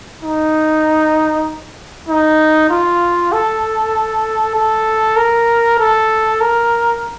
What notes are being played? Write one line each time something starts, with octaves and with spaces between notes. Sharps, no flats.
D#4
D#4
F4
A4
A4
A#4
A4
A#4